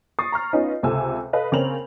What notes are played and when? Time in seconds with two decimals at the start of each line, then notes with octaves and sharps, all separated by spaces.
0.19 C#6 D#6 A6 C7
0.32 A#5 C#6 F6
0.53 B3 C#4 D#4 F4 D#5
0.83 C#2 C3 A4 G#5 E6
1.33 A4 B4 D#5 F5
1.52 C#3 C4 C#4 A#4 F7 F#7